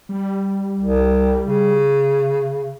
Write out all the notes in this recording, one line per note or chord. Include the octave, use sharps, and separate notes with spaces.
G3
C2
C#3